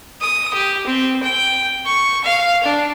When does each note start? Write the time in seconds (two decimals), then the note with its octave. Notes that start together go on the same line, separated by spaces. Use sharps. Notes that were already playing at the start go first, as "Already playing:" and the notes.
0.21 D#6
0.54 G4
0.86 C4
1.23 G5
1.86 C#6
2.24 F5
2.63 D4